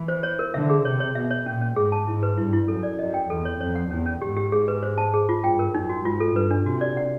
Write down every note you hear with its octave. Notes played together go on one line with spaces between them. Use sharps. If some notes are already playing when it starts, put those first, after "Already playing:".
Already playing: E3
C5
C#5
A#4
D3 E5
G#4
C3 C#5
C#5
B2 E5
C#5
A#2 C#4
C#4
G#2 G#4
A5
G#2 E4
B4
G2 E4
E4
F#2 A4
D5
F#2 D#5
G5
E2 A4
C#5
F2 C#5
F#5
E2 C#4
C#4
G#2 G4
G4
G#4
B4
C5
A5
G#4
F4
G2 G5
A#4
F#2 D#4
F#4
G#2 F4
A4
G2 B4
D4
C3 F#4
D5
F#5